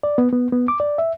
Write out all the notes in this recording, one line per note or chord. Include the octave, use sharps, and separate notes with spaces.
D5
B3
B3
B3
D6
D5
E5